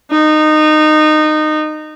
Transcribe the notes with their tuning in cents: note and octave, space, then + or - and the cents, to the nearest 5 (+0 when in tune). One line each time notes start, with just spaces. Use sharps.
D#4 -20